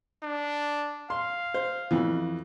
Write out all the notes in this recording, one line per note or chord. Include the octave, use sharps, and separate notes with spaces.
D4
F5 C6
C5
F2 E3